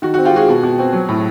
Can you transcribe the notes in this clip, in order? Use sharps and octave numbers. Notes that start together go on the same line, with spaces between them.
D#3 F#4
F#4
C4
F4 G4
G#3 F#4 G#4
B2
B2
C4
F#3
A2